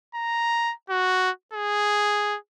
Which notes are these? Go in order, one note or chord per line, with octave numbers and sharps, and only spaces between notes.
A#5
F#4
G#4